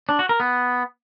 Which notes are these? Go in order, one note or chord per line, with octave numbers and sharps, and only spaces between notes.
D4
F#4
A#4
B3